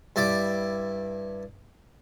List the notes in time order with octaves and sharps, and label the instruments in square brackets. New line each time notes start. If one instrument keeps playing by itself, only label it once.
[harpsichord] G2 E4 D5 D6